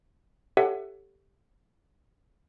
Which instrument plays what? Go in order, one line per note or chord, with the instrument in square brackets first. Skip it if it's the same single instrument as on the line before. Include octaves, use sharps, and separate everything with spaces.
[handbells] G4 A4 C#5 E5 F#5